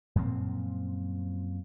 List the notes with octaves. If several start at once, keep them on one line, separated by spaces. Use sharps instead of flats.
F#2 A#2 F3 C4